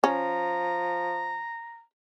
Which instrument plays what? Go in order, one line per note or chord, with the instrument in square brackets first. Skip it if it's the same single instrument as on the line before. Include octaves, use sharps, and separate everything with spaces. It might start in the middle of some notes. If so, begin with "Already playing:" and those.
[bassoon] F3 [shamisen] C#4 [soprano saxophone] A#5